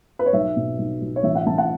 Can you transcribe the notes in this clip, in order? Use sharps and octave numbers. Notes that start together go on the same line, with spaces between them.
B4
C#5
B1 E5
B2
B1
B1
C#5
A1 E5
F#5
A1 A5
F#5